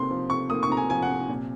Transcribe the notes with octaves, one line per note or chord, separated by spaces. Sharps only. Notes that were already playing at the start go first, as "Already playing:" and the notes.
Already playing: C3 A#3 C6
F3
C3 C#6
A#3 D#6
C#6
C3 A#5
G#5
F3 G#5
F#5
C3
A#2